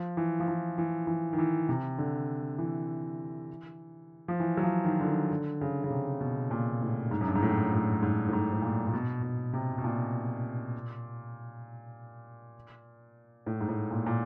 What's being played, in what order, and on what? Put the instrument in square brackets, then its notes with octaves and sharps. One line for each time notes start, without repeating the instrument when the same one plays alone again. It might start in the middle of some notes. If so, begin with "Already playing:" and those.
Already playing: [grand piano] F3
E3
F3
E3
E3
E3
D#3
E3
C3
D3
E3
F3
E3
F#3
F3
D#3
D3
D#3
D3
C#3
C#3
C3
B2
A#2
A2
G#2
F#2
G2
G#2
A2
A2
G#2
A2
G#2
A2
A#2
A#2
B2
B2
C3
B2
A#2
A2
G#2
A2
A#2
A#2